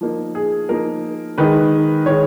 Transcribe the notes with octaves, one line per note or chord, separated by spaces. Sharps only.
F3 A#3 D#4
G#4
F3 A#3 D#4 A#4
D#3 G#3 D#4 B4
D#3 G#3 D#4 C#5